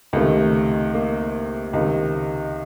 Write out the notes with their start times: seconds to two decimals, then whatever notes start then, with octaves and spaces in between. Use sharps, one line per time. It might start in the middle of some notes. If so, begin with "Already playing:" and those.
0.13 C#2 C3 D#3 A3
0.94 A#3
1.73 C#2 C3 D#3